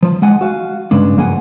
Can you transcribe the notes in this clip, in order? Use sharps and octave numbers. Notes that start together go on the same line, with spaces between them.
F3
G#3 F#5 G#5
F#4 F5
G2 C#3 G#3 D4
F#2 F3 A#3 G#4 F#5 G#5